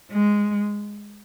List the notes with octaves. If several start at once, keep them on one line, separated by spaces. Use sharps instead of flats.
G#3